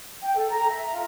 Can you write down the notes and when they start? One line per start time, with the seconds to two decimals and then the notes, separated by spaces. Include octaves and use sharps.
0.23 G5
0.36 A4
0.50 A#5
0.71 E5
0.92 F4